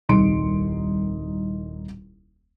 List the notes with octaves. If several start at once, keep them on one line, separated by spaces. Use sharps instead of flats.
D#1 C2 D#4 C6 C#7 D7